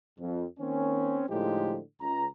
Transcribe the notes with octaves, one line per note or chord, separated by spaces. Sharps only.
F2
D#3 A#3 C4 C#4
A2 D3 F3 G#3 D#4 G4
C#2 A#5